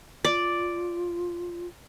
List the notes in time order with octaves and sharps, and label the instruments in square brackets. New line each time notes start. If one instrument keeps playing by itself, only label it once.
[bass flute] F4 [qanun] D5